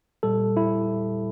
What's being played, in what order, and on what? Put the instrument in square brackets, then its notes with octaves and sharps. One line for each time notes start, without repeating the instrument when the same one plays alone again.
[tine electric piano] A#2 G3 A4
E4